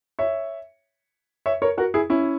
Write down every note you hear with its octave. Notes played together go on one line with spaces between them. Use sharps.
C#5 E5
C#5 E5
A#4 C#5
F#4 A#4
E4 G#4
C#4 E4